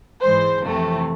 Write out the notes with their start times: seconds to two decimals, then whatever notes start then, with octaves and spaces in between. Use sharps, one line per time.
0.21 G#2 E3 G#3 C5
0.63 F2 C3 E3 A3